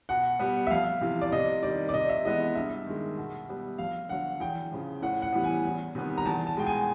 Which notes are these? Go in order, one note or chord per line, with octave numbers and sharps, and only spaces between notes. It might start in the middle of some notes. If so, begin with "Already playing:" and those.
B2 F#5
G3 B3
E5
F2 F5
C3 E3
D5
C3 D#5
D#3 G3 D5
D5
C3 D#5
E5
E3 G#3 B3 D#5
G2 E5
D#3 G#3
B2
G3 B3
F2 F5
D3 F#3 F#5
E2 G5
C#3 F3
A2 F#5
F#5
E3 G3 B3
G#5
E2
C3 D#3 G3 B3
A#5
E2 A5
A5
B2 G#3 G5
G#5